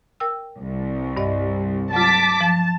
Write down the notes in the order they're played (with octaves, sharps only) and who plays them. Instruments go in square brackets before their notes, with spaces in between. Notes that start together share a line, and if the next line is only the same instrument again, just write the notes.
[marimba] A#4 G5 E6
[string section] C2
[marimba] G2 D5 D#5
[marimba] F#3 F4 [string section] A5 D6 B6
[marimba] F3 [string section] A5